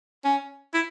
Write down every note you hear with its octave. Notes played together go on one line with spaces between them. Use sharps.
C#4
E4